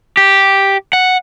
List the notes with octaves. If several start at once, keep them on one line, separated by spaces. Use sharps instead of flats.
G4
F#5